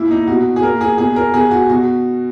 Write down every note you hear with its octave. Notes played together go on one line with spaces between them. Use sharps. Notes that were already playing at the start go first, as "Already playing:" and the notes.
Already playing: A#2 E4
D#4
B2 F#4
G#4
A#2 A#4
G#4
B2 G#4
A#4
B2 G#4
F#4
B2 F#4